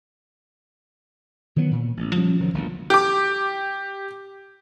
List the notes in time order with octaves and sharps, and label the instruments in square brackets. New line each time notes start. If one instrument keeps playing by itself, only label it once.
[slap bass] D#3 E3 F#3 B3
A#2
A1
F3 G3 C#4
C2 D#3 F3 F#3
G1 D2 A#2
[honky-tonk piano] G4 D6